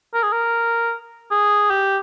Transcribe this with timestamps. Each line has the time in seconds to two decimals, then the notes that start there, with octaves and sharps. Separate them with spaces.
0.14 A#4
0.23 G#4
0.32 A#4
1.31 G#4
1.70 G4